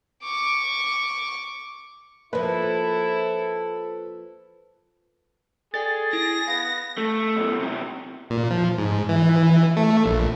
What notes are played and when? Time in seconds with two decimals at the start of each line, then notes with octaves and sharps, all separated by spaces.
0.23 C#6 D6
2.33 F3 A#3 E4 A4 B4
5.74 G#4 A4 D5 G5 A6
6.13 E4 A#6
6.48 B3 F5
6.98 A3
7.36 F#2 B2
7.59 C3 F#3
8.30 A#2
8.50 F3
8.78 G#2
9.09 E3
9.77 A3
10.06 A#1